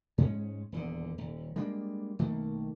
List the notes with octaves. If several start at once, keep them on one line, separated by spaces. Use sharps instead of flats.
G#2 G#3 B3 C#4
D#1 E2 D3
D#1
G3 G#3 A#3 D4
B1 D#3 A3 A#3